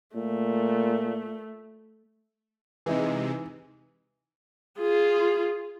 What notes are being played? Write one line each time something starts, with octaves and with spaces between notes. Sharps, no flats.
A#2 A3
C3 E3 G#3 D#4
F4 G#4